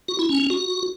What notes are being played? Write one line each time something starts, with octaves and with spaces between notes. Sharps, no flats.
F#4
E4
C#4
C#4
F#4